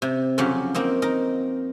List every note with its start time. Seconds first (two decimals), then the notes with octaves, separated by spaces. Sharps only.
0.02 C3
0.38 F2 C#3 F#3 C#4 G4 F5
0.75 A#3 C4 D#4
1.02 D#4 A#4